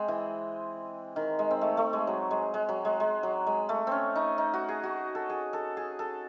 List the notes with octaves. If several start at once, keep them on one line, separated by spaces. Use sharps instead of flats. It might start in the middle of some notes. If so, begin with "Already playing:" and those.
Already playing: G#3 C4
E3
D#3
G#3
C4
A3
A3
G#3
F#3
G#3
G#3
F#3
G#3
G#3
F#3
G#3
A3
C4 C#4
D#4
D#4
F#4
G#4
F#4
A4
G#4
A4
G#4
A4